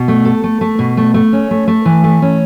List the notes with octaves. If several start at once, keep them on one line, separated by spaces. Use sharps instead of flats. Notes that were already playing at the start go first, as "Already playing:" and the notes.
Already playing: B2
A3
A4
A3
A3
B2
A3
A3
C#4
A3
A3
E3
A3
C#4